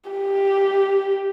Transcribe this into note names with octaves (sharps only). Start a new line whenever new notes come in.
G4